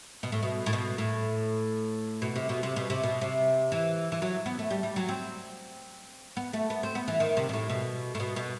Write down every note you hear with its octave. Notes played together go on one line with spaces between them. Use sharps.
B2
A2
B2
A2
B2
A2
B2
C3
B2
C3
B2
C3
B2
C3
E3
E3
F#3
B3
A3
G3
G3
F#3
C4
B3
A3
B3
C4
B3
E3
D#3
C3
B2
A2
B2
A2
B2
B2